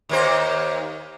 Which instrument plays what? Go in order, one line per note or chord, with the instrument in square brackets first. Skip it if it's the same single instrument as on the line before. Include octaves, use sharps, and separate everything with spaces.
[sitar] D#2 A#3 C5